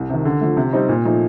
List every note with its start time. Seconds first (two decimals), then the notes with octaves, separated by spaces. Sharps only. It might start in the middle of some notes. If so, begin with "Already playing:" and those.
Already playing: C2
0.10 C3 D#3
0.25 D3
0.41 F3 A3
0.57 C3
0.73 G3 C4 D#4
0.89 A#2
1.05 F3 A3 D#4